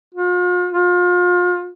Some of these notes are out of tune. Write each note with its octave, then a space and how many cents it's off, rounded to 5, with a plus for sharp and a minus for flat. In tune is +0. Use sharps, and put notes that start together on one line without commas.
F4 +40
F4 +35